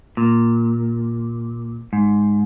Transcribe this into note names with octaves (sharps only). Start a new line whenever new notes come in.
A#2
G#2